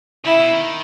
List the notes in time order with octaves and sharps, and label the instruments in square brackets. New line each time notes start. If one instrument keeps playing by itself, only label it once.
[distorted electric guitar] C#3 [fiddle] E4
[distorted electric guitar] B2
D#3